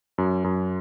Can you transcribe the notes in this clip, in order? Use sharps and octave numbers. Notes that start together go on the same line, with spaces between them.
F#2
F#2